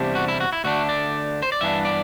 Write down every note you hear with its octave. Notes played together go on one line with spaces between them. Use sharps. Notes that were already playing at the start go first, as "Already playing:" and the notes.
Already playing: E2 C3 G3 D4
F#4
E4
F#4
E4
D2 D3 A3 D4 F#4
D5
C5
D5
G2 E3 B3 D4 E5
D5